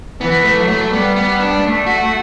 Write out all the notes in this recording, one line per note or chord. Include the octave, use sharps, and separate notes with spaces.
E3 B3
A3
F#3
A3
G3 B3
B3
D4
A3
F#4